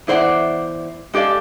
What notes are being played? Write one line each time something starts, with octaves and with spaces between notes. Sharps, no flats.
E2 E4 C5 D5 F#5
G#3 G4 A4 D5 F5